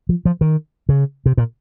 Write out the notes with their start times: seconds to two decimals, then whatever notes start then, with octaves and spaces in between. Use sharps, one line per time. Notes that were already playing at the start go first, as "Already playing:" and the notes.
0.09 F3
0.25 F3
0.41 D#3
0.89 C#3
1.26 C3
1.37 A#2